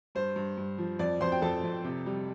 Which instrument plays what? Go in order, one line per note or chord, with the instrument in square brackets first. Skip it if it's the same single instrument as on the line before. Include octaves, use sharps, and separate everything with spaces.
[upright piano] G2 C5
G2
G2
F3
F2 D5
F2 C5 C6
G5
F2 A4 A5
F2
C3
G3